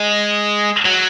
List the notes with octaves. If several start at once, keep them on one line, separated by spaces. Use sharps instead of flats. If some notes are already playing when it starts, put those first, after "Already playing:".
Already playing: G#3
F#3